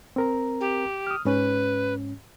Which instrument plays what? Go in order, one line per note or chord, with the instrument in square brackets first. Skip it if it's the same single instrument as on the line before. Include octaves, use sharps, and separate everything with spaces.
[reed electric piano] C4 A#4 A#5
[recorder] G4
[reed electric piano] D#6 F6
[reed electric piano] G#2 C#4 [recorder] B4